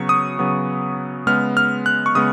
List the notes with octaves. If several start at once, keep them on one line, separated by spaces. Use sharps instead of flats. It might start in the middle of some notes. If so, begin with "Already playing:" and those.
Already playing: C#3 F#3 B3 C#6
D#6
C#3 F#3 B3
C#3 G#3 B3 F6
F6
F#6
C#6
C#3 G#3 B3 D#6